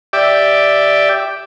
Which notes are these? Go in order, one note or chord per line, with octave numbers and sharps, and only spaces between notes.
G4 D5 E5